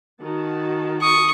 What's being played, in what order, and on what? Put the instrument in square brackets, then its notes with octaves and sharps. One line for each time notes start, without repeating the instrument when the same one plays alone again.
[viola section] D#3 F#4 A5
[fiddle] C#6 [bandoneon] D#6